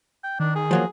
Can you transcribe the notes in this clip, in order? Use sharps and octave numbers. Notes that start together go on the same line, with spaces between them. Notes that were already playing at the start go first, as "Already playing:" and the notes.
G5
D#3 D4
G#4
F3 F#3 A#3